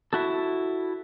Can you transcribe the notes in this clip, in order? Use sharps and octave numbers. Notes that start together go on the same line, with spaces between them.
E4 F#4 A4